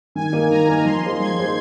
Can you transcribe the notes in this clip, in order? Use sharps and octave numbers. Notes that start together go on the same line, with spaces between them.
D#3 G#5
A#3 D#4 A#4
D#3 A#5
A#3 D#4 A#4
F3 C6
A#3 D#4 G#4 C5
F3 G#6
A#3 D#4 G#4 C5